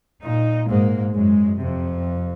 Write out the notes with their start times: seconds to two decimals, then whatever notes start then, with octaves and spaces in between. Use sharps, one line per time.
0.23 A#2 D#4
0.68 G#2 A#3
1.15 F#2 G#3
1.61 F2 C3